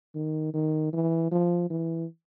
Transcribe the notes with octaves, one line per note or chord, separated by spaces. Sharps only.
D#3
D#3
E3
F3
E3